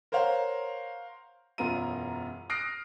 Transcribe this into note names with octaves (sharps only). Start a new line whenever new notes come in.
A#4 C5 C#5 F5 F#5 A#5
E1 F#2 B3 F4 A#5 D#7
D#6 F6 F#6 A#6 C7 D7